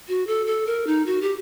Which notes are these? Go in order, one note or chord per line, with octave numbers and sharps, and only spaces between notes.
F#4
A4
A4
A#4
D#4
F#4
G4